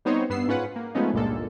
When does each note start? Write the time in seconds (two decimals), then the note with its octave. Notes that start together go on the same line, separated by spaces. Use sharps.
0.05 G3 B3 C4 D#4 C5 C#5
0.30 G2 B3 E6 C7
0.48 G#2 C#4 F4 B4 F#5
0.76 A#3
0.95 F3 G#3 A3 B3 C#4 D#4
1.14 G1 C#2 A#2 G#3 A#3 A4